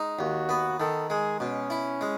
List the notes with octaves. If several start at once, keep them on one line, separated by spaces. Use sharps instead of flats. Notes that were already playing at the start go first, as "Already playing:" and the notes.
Already playing: G#3 D#4
D#2 F#4
B3
D#3 A4
G#3 G#4
B2 C#4
E4
G#3